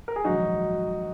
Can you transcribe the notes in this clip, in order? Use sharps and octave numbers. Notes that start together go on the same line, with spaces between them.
A#4
G#4
A#1 G#2 D#3 F#3 D#4 F#4